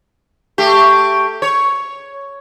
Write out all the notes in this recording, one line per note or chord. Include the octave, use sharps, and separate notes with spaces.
A3 G4
C#5